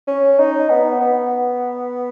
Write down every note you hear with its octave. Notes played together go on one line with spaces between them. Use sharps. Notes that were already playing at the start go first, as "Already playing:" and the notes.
C#4
D#4
B3
B3